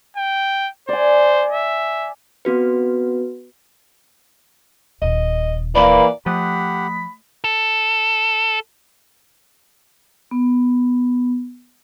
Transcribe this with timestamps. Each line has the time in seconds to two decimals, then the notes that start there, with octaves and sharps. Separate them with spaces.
0.17 G5
0.89 C5 D5 G#5
1.52 E5
2.45 B3 C4 F#4 B4
5.02 D#1 D#5
5.75 E3 A#3 D5 B5
6.26 F3 A3 G4 F#5 B5 D#6 F#6
7.44 A4
10.31 B3